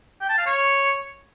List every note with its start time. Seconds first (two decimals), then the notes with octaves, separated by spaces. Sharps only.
0.21 G5
0.29 A5
0.38 F5
0.46 C#5